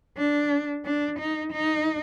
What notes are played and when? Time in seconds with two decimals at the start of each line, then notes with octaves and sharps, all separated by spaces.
0.18 D4
0.85 D4
1.19 D#4
1.52 D#4